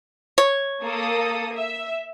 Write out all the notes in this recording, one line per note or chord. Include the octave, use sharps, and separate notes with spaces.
C#5
A#3 A4 D#6
E5